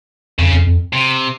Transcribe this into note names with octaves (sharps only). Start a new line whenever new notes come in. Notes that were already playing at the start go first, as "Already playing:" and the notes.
F2 C#3
F2
F2
C3